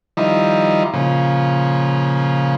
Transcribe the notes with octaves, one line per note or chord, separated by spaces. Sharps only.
D#3 F3 G3 D#4 E4
A#2 C#3 F3